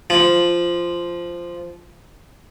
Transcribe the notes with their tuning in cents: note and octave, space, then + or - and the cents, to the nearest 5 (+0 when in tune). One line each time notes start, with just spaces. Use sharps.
F3 -10